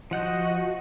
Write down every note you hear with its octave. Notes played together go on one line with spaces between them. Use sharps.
F3 F#4 D#5 F#5 G6